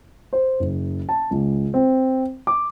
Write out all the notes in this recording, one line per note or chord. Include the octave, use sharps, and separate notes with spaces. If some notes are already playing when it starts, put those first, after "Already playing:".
C5
F#1
A5
C#2
C4
D6